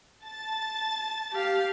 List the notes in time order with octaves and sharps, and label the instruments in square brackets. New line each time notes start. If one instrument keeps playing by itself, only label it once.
[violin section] A5 A6
[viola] G4 F5